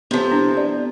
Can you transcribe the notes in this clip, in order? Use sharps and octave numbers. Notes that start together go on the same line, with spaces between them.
C3 F3 B3 C4 A4
D4 E4
D5